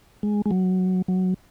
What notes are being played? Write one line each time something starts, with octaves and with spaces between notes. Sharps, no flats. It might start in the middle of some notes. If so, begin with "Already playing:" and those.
G#3
G#3
F#3
F#3